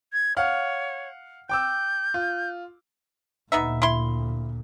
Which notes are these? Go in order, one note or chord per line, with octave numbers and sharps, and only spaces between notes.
G#6
C#5 F5 F#5 F6
G5 D6 E6 G6
F4
D2 A#2 B3 D#4 E5
E4 C6